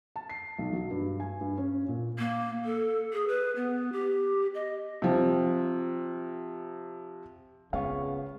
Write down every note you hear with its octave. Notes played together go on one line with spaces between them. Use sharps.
A5
C7
B1
F#3
G2
G#5
G2
C#4
A#2
A#3
A4
G#4
B4
B3
G4
D#5
C3 F3
C#3 G#3 B3 C4 F4 C#5 F5